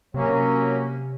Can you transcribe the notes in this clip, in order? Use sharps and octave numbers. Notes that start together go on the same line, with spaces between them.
C3 F#3 A#3 C#4